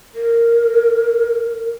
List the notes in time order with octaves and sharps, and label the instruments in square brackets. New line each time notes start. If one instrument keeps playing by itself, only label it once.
[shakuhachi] A#4